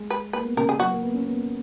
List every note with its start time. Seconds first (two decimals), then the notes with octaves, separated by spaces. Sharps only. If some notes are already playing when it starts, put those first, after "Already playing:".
Already playing: G#3
0.10 B4
0.33 A#3 B4
0.45 B3
0.57 C#3 A#4
0.68 C#3 G#4
0.80 F#3 F#4
0.90 A#3
1.02 B3
1.14 C#4
1.25 B3